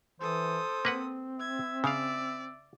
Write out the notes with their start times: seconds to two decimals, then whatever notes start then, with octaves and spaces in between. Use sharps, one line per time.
0.21 E3 A4 C5 D#6
0.85 A#3 C4 B4 F#5
1.40 E5 G#6
1.84 C#3 D5 F5